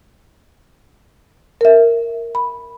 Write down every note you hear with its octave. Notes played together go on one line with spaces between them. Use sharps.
A#4 E5
B5